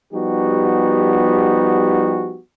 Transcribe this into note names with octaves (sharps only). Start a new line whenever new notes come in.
F3 G3 B3 D#4 F#4 G4